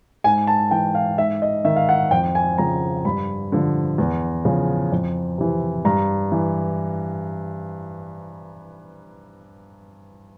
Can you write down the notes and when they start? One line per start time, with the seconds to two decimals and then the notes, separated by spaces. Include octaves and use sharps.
0.24 G#2 G#5
0.47 A5
0.71 E3 G5
0.95 F5
1.18 G#2 E5
1.42 D#5
1.65 D#3 E5
1.76 F5
1.89 F#5
2.11 F2 G5
2.35 G#5
2.58 C#3 F3 A#5
3.05 G2 B5
3.52 D3 F3
3.98 E2
4.45 C#3 F3
4.92 F2
5.38 C3 E3
5.85 G2 A#5
6.32 E3